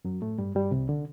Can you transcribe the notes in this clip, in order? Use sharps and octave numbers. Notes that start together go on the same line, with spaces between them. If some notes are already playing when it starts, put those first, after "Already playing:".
F#2 F#3
A2 A3
G2 G3
G2 G3
C2 C3
D3